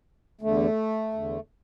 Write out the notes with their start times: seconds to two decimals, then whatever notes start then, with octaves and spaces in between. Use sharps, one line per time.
0.41 E2 D3 A3
1.13 E2 D3